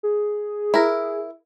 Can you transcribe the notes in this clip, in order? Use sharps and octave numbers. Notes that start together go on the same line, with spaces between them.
G#4
E4 A#4